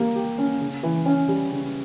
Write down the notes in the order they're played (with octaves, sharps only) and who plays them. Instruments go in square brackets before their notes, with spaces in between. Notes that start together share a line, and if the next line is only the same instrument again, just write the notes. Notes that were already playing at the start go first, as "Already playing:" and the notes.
Already playing: [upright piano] G3 A#3
G4
C#4
C#3
E3
C#4
G3
C#3